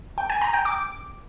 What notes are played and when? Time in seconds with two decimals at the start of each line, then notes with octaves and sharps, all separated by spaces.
0.18 G5
0.30 G#5
0.41 A#5
0.53 G5
0.65 D6